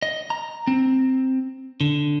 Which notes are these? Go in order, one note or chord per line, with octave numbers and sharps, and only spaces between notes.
D#5
A#5
C4
D3